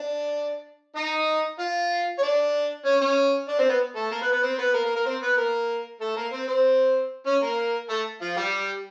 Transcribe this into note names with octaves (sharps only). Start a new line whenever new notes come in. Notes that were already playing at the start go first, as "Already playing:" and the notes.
Already playing: D4 D5
D#4 D#5
F4 F5
C#5
D4 D5
C#4 C#5
C#4 C#5
D4 D5
C4 C5
B3 B4
A3 A4
A#3 A#4
B3 B4
B3 B4
C4 C5
B3 B4
A#3 A#4
A#3 A#4
A#3 A#4
C4 C5
B3 B4
A#3 A#4
A3 A4
A#3 A#4
C4 C5
C4 C5
C#4 C#5
A#3 A#4
A3 A4
F3 F4
G3 G4